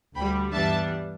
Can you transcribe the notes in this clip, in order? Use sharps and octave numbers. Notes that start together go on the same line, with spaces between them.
D2 D3 G3 G5 B5
G2 E3 G3 B3 D4 E5 A5